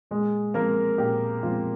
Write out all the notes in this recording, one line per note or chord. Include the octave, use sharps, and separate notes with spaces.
A#2 G#3 G#4
F3 G#3 A#3 C4 A#4
A#2 G4
F3 G#3 C4 F4